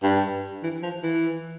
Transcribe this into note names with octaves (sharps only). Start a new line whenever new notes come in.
G2
E3
F3
E3